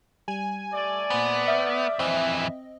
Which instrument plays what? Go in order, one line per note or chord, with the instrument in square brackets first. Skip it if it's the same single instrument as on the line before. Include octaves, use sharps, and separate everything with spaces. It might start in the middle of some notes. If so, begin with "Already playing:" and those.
[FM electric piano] G3 [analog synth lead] G#5
[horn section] A3 D5
[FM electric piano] A#2 C5 [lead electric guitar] B3
[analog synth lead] E5 [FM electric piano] D#6 F6 G6
[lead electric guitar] F2 E3 [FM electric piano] C4 D#5